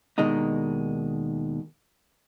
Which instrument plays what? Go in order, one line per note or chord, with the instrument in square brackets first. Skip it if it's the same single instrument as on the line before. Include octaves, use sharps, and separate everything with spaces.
[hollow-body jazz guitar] D#2 B2 D#3 G#3 D4 D#4